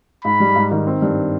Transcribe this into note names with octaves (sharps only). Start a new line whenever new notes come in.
G#2 B5
G3
G#2
D#3
C4
G2